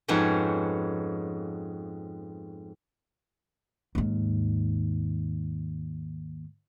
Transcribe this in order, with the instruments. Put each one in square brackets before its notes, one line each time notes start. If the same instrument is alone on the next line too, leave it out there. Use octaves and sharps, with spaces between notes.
[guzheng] F2 G#2 B3 C#4 F#4
[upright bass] D#2 G#2